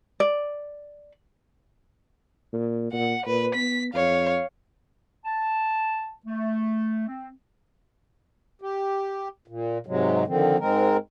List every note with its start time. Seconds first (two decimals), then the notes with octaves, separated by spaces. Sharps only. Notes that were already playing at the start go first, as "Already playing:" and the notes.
0.20 D5
2.53 A#2
2.92 A#2 F#5
3.26 A#2 B4
3.55 B3 B6
3.94 F2 C#5 F5
5.25 A5
6.26 A3
7.08 C4
8.62 G4
9.48 A#2
9.87 G#2 C3 F#3 G#3
10.27 D3 D#3 F3 C4
10.60 G#2 G#3 C4 A#4